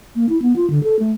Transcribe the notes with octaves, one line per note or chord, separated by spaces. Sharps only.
A#3
E4
B3
F4
D3
A4
A3